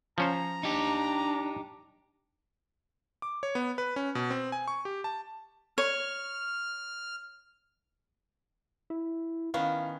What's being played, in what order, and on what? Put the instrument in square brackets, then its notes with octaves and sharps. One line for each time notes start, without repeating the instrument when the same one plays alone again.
[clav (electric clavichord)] F3 C#4 C5 [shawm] A#5
[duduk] D4 [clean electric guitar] D#4 G4
[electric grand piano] D6
C#5
B3
B4
C#4
B2
C4
G#5
C#6
G4
A5
[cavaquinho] C#5 [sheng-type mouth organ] F6
[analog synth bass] E4
[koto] D#3 B3 C#4 [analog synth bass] E4 [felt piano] F5